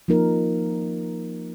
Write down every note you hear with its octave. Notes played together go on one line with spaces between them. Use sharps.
F3 A#3 D#4 A#4